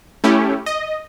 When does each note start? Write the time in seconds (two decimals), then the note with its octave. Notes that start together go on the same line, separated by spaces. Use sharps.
0.24 A3 C#4 E4 G4
0.66 D#5